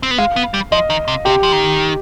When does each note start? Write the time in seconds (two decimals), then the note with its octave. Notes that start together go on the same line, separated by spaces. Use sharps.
0.03 C4
0.11 B3
0.18 G#3 F5
0.36 B3
0.54 G3
0.72 F3 D#5
0.90 D#3
1.08 C3
1.25 C3 G4
1.43 F3
1.52 D#3